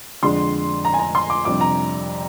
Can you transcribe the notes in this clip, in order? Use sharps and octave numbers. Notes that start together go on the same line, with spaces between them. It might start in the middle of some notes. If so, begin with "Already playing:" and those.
F2 D3 G#3 D4 C6
A#5
G#5
A#5
C6
D6
F2 C3 G3 D4 D6
A#5